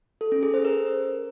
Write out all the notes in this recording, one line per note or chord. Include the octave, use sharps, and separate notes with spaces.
A4
C#4
G#4
C5
A#4